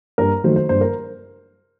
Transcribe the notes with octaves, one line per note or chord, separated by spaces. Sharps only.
G2 A#4
D#3 F#3 A3 C5
C5
G2 C5
A#4